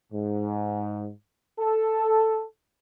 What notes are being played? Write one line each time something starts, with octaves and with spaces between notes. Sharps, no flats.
G#2
A4